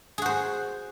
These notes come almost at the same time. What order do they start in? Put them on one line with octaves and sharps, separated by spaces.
G#4 F#4 C5